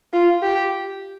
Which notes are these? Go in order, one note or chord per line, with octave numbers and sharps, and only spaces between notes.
F4
G4